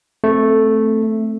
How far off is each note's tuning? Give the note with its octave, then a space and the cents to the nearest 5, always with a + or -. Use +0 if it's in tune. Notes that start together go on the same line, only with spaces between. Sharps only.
A3 +0 C4 +0